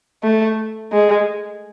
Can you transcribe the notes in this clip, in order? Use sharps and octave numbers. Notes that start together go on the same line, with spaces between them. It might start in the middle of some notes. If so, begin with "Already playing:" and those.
A3
G#3